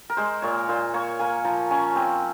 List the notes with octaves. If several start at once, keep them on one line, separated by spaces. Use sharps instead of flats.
A#4
G#3 C5
A#2 C#5
A#2 C5
A#3 C#5
A#3 G#5
F3 A#5
C#4 G#5
C4